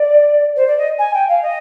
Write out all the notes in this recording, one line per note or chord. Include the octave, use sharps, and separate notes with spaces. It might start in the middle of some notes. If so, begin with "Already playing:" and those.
Already playing: D5
C5
D5
D#5
G#5
G5
F5
D#5